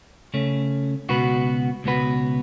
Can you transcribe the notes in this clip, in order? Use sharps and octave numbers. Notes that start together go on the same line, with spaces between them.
C#3 A3 C#4
C#2 B2 B3 F#4 B4
C#2 B2 B3 F#4 B4